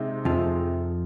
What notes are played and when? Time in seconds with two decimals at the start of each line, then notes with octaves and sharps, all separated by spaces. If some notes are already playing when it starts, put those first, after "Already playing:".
Already playing: C3 G#3 C4 D#4
0.25 F2 F3